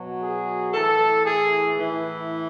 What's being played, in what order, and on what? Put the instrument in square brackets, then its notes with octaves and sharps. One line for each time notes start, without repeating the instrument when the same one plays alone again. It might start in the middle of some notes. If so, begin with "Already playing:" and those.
Already playing: [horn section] B2 F#3
G#4
A2 E3 A4
G#4
A2 E3